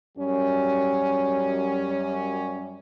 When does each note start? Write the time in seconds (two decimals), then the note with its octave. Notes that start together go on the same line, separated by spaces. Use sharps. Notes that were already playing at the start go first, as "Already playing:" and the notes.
0.18 F#2 G3 C#4